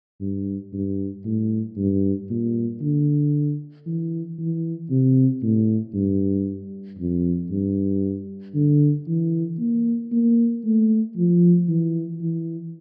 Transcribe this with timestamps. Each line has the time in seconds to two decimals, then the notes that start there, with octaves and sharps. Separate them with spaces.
0.21 G2
0.73 G2
1.25 A2
1.77 G2
2.30 A#2
2.81 D3
3.86 E3
4.39 E3
4.90 C3
5.43 A2
5.94 G2
6.99 F2
7.51 G2
8.55 D3
9.08 E3
9.60 A#3
10.12 A#3
10.65 A3
11.17 F3
11.69 E3
12.21 E3